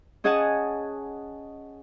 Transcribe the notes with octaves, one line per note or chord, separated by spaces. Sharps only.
C#4 G#4 D#5 F#5 G#5 A5